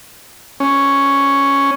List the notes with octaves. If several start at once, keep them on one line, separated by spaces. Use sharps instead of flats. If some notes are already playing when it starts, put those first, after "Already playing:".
C#4